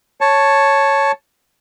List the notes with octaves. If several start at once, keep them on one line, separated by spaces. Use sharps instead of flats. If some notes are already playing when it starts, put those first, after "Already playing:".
C#5 A5